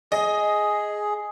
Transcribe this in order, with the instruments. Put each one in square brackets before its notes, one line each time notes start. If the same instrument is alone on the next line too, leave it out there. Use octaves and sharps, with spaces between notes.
[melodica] G#4 [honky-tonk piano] D#5